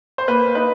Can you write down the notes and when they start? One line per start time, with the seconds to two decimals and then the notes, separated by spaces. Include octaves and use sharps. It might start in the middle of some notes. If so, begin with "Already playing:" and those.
0.18 C5
0.28 A#3 B4
0.55 D#4 B4